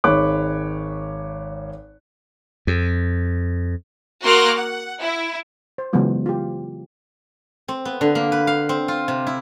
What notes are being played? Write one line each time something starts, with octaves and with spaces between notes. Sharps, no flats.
G#1 G#3 C#5 B5 D6 F#6
F2
A#3 F#4 C6 D6 F6 F#6
F#5
E4
C5
C#3 E3 F#3 G#3 B3 F4
F4 G4
C4
B3
D3
A#3
B4
F5
C4
F4
C3
E4